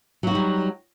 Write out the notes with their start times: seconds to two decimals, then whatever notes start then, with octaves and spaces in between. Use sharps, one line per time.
0.23 F#3
0.27 F#4
0.31 D#4
0.35 G3